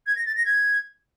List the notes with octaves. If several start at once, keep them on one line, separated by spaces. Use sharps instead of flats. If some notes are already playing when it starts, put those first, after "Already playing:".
G#6
A#6
A6
A#6
G#6